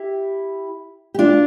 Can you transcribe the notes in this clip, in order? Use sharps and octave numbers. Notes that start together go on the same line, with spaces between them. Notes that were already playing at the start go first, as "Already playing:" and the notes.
Already playing: E4 G4
G4
D4 F4